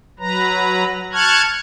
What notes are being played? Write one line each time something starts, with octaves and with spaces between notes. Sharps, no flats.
F#3 B4 A#5
A5 C#6 F6 F#6 G#6